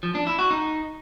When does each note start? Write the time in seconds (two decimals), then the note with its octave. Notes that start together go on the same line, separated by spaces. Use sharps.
0.03 F3
0.15 D4
0.27 E4
0.39 F#4
0.51 D#4